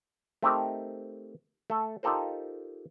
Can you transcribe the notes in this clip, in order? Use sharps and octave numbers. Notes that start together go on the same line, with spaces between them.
A3 C4 D#4 G4 A#4
A3 A4
D#4 F4 G4 A4 A#4 C5